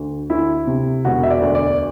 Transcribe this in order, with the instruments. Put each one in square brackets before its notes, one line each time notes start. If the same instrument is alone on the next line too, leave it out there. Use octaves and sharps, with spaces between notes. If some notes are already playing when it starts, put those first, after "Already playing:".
Already playing: [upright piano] D2
D2 E4
C3
E1 F#4
E5
D5
D2
D5